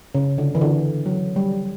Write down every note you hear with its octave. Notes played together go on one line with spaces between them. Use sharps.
C#3
D3
E3
D3
F#3
G3